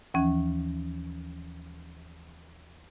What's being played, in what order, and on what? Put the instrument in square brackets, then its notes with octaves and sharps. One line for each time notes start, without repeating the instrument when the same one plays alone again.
[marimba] D#2 E3 F3 C#4